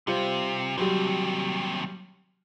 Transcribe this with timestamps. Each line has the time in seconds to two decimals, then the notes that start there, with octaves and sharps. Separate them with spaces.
0.07 C3 G3 F4 C5
0.78 D#2 C3 F#3 G3